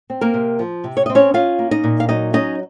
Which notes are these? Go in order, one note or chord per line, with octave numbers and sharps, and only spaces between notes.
C4
A#3 A#4
C3
F3
C3
C#5
C4 D#5
C#4 C#5
C#4 F4 F5
A#3
D#4 D#5
A#2
F5
F#3 D#4 D#5
C#4 D#4 D#5